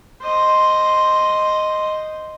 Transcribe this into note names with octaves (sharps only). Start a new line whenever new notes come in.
C5 D#5